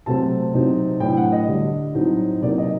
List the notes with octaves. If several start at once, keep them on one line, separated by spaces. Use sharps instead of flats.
C3 F#3 A3 C4 A5
C3 F#3 C4 D#4
A2 F#3 A3 D4 G5
F#5
D#5
D3 G3 D4
A2 F#3 A3 C4 D#4
C3 F#3 A#3 D#4 D5
D#5